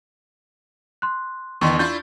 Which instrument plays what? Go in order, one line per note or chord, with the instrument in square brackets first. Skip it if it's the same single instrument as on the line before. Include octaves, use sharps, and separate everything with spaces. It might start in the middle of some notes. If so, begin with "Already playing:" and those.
[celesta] C6 F#6
[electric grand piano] E2 [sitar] D3 [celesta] C6 C#6
[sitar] D4 E4 F4 [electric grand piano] G6 A6